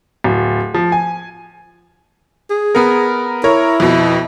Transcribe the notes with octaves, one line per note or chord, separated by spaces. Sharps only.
D1
F3
G#5
G#4
B3 A#4
E4 A#4 C#5
F2 B2